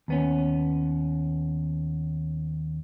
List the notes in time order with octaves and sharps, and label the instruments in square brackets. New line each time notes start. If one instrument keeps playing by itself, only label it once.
[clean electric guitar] D#2 B3 C#4